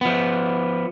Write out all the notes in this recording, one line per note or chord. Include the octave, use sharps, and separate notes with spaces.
F3 B3